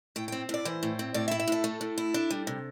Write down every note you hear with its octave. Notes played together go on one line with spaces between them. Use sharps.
A2 G5
C4 G5
A2 D5
E3 C5
A2
C4
A2 D5
E5
E4
E5
A2 A4
A3
A2
E4
D4
G3
C3